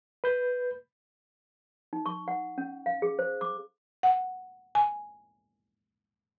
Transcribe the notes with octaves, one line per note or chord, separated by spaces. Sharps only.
B4 G6
D#4
C#6
F#5
C#4
F5
G#4
C5
D6
F#5
G#5